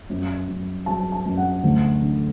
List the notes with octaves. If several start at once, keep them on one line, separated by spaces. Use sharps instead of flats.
F#2
F#2
F#3 A5
A5
F#2
F#5
D2
D3